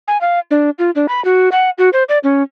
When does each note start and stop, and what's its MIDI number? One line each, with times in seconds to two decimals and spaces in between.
0.08 0.20 80
0.21 0.39 77
0.51 0.70 62
0.79 0.91 65
0.95 1.06 62
1.08 1.23 83
1.25 1.49 66
1.52 1.70 78
1.78 1.90 66
1.93 2.04 72
2.09 2.19 74
2.24 2.43 61